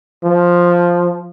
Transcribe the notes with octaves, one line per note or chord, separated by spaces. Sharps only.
F3